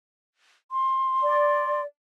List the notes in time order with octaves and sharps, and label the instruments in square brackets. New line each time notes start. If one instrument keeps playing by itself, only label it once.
[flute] C6
[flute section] D5